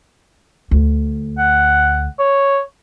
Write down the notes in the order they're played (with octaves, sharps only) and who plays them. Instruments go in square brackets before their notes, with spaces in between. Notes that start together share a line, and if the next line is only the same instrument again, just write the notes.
[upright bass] D2
[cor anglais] F#5
C#5